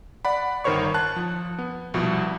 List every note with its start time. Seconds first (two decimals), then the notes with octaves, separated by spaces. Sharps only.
0.25 D5 F#5 B5
0.64 G1 D#3 A#4 C5 C#5 C#6
0.94 A5 F#6
1.16 F3
1.58 B3
1.94 C2 B2 F3